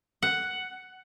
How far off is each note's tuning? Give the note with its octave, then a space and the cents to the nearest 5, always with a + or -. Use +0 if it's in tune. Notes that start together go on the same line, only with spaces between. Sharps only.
F#5 +5